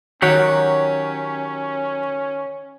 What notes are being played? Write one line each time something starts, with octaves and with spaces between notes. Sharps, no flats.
D#3 F#3 C#4 G4 C#5 F#5